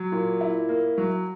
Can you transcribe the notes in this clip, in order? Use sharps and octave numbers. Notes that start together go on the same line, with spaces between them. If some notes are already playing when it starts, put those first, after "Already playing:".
Already playing: F#3
A#2
E4
A#3
F#3